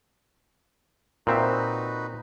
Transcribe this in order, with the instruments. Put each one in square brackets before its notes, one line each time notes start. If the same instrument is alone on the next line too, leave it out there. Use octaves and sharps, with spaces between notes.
[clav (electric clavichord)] A#2 C4 E5 [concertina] D#4 F#4 B4